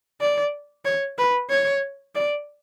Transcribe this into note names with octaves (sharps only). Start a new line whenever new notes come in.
D5
C#5
B4
C#5
D5